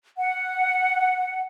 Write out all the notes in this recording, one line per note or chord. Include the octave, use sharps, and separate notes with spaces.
F#5